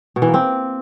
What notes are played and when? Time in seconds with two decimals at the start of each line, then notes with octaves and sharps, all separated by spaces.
0.16 B2
0.22 E3
0.28 A#3
0.34 C4